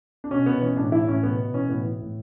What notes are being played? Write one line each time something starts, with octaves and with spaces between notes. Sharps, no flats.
D4
B2 C#4
B2 B3
E3 C#4
A2 D4
E3 E4
A2 C#4
B2 B3
B2
E3 C#4
A2 B3
E3
A2